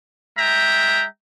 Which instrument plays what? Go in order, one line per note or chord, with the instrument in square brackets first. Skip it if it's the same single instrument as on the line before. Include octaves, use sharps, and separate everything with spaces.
[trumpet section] G#3 E5 G5 A#5